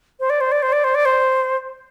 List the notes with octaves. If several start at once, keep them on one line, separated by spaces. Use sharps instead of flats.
C5
D5
C5
D5
C5
D5
C5
D5
C5